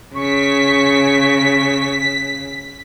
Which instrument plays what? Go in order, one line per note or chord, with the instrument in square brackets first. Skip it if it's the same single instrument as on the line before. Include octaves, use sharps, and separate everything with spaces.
[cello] C#3 [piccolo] C#6 [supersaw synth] B6